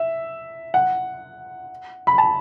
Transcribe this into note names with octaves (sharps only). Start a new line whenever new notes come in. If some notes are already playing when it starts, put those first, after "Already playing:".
Already playing: E5
F#5
B5
A5